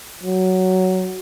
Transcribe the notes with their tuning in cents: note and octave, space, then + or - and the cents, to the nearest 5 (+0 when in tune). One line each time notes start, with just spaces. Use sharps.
F#3 +10